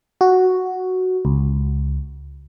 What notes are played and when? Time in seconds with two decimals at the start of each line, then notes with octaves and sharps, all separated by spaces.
0.21 F#4
1.25 C#2